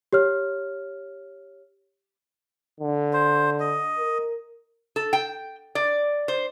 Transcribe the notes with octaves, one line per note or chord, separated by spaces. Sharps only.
G4 C#5 F6
D3
C5
D#5
A#4
A4
G5
D5
C5